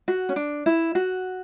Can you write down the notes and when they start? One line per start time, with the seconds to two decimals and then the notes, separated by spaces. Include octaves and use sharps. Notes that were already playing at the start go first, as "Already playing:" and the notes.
0.08 F#4
0.29 C#4
0.36 D4
0.66 E4
0.95 F#4